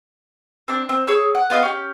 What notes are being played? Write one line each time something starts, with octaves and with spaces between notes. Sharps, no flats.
C4 D4
C4
G#4 C#5 E6
F#5
B3 F4 D#5 F5
C#4 G4